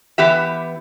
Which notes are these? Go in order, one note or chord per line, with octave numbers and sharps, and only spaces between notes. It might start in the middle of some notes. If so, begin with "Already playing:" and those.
E3 B3 G4 E5